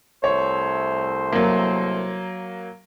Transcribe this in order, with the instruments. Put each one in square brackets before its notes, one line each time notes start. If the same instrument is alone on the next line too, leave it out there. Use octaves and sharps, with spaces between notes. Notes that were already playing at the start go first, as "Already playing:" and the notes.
[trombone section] C2 A3 C5 [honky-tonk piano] C#5
[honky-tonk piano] F#3 A#3